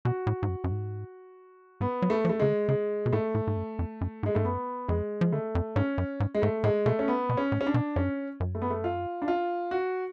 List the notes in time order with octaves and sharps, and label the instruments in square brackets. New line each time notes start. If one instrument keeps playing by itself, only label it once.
[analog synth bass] B2 [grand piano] F#4
[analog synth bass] A2
G#2
F#2
F#2
G#2
[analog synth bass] G#2 [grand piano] B3
[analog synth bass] F#3
[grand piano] A3
[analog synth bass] F3
[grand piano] A3
[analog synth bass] C#3 [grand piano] G#3
[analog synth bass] D3
[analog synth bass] C#3 [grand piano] G#3
[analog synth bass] B2
[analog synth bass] A2 [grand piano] A3
[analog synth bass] A2
G#2
F#2
F2
F#2
G#2
[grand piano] G#3
[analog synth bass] G#2 [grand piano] A3
[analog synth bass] F#2 [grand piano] B3
[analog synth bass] F2 [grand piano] G#3
[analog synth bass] F3
[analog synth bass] D3 [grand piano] A3
[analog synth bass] F2
[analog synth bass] G#2 [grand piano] C#4
[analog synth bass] F#2
G#2
[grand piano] G#3
[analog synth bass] G#2 [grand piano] A3
[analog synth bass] A2 [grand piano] G#3
[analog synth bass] B2 [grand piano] A3
[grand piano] C#4
B3
[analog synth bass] B2
[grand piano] C#4
[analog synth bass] A2
[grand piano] C#4
D4
[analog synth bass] B2
[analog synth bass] F#2 [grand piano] C#4
[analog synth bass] F#2
[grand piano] A3
B3
A3
F4
D4
F4
F#4